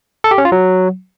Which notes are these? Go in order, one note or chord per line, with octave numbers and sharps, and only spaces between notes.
A4
G4
C#4
F4
F#3